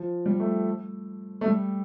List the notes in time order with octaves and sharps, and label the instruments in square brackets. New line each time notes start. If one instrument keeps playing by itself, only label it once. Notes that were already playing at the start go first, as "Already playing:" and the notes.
Already playing: [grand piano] F3
G3
A3
A3
G3